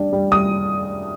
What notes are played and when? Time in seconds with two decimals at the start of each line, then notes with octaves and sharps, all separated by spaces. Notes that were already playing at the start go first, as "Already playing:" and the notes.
Already playing: G3 D4
0.13 G3
0.32 G3 D#6